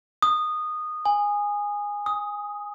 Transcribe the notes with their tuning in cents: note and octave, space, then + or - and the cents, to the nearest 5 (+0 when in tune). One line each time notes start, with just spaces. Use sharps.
D#6 -15
G#5 -15
D#6 +10